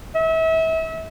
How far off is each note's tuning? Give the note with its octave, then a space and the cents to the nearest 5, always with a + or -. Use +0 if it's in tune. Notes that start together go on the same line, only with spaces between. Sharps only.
E5 -35